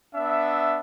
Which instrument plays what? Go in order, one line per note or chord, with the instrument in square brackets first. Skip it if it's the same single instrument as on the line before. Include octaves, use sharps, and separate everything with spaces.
[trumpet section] B3 D4 E5